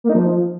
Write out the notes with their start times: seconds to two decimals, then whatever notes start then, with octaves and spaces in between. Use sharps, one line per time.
0.04 A#3
0.10 D#4
0.15 F3